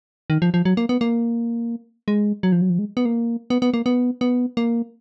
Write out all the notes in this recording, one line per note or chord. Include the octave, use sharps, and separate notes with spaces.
D#3
F3
F3
F#3
A#3
B3
A#3
G#3
F#3
F3
F#3
F3
G#3
B3
A#3
B3
B3
A#3
B3
B3
A#3